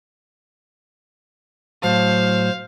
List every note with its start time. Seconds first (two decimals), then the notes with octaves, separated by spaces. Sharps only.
1.83 A2 F#3 C5 F5 A5